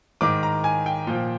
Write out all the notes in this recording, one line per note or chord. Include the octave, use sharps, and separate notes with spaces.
G#2 D#3 D6
A#5
G#5
G5
A#2 F3